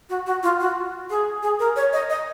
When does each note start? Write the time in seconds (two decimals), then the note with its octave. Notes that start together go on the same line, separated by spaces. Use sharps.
0.09 F#4
0.26 F#4
0.43 F4
0.60 F#4
1.10 G#4
1.43 G#4
1.59 A#4
1.76 C#5
1.93 D#5
2.10 D#5